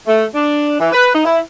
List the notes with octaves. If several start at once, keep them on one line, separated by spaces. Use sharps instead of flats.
A3
D4
E3
B4
D#4
E4